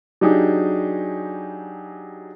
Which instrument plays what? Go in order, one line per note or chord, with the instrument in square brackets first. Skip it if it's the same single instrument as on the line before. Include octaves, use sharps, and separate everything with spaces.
[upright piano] F#3 D4 D#4 G4 G#4